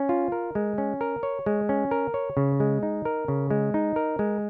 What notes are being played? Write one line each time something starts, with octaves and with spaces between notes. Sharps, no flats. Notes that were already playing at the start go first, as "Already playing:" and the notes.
Already playing: C#4
F4
A#4
G#3
C#4
A#4
C#5
G#3
C#4
A#4
C#5
C#3
G#3
D#4
A#4
C#3
G#3
D#4
A#4
G#3